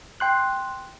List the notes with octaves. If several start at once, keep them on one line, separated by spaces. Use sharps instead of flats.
G5 C6 F#6